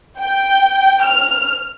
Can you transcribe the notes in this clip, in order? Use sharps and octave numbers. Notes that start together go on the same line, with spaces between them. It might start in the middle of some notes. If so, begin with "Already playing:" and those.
G5
F6